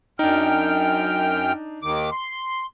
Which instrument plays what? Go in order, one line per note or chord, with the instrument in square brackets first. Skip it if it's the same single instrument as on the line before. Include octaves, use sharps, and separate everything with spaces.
[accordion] F#2 G5 F6 [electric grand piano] D4 D#4
[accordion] D#2 D#3 D6
C6